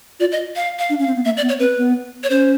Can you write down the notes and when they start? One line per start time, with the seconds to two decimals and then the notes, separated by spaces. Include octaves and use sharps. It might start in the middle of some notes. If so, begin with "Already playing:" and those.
0.20 F4 D5
0.32 D#5
0.56 F5
0.79 F5
0.90 D4
0.99 C#4
1.02 F5
1.07 C4
1.16 B3
1.25 A#3 E5
1.37 D5
1.42 B3
1.49 C#5
1.59 C4 B4
1.77 B3
2.23 C#5
2.30 C#4 C5